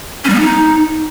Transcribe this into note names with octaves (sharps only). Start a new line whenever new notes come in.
C#4
G3
B3
D#4